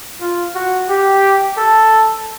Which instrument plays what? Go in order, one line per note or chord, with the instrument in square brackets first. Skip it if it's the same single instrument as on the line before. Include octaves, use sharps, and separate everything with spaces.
[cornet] F4
F#4
G4
A4